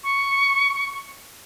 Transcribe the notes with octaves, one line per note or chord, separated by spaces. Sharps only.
C#6